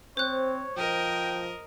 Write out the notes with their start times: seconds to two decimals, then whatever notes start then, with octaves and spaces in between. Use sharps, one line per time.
0.17 C4 C5 C#5 F#6
0.77 F3 A#4 D#5 G5